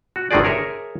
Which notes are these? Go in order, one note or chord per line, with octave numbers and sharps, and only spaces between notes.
F#4
G1 D3 D#3 D#4 G#4 D5
G#4 A#4 C#5 E5